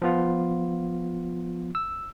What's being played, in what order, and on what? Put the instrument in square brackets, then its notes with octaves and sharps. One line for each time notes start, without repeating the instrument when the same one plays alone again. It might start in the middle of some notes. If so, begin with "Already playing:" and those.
[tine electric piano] F3 B3 F4
E6